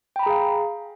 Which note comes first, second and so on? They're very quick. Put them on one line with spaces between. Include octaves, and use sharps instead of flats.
G5 B5 A#5 G#4 F5